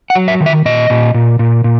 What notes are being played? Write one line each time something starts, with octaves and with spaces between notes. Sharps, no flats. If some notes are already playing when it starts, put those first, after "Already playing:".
F#5
F#3
E5
D#3
E5
A#2 D#5
A#2
A#2
A#2
A#2